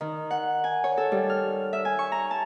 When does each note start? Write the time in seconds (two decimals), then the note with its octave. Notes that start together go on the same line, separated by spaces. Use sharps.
0.01 D#3
0.31 F#5
0.64 G#5
0.84 C#5
0.97 A4
1.12 G3
1.29 F6
1.73 E5
1.85 G#5
1.99 C#6
2.12 A#5
2.31 A5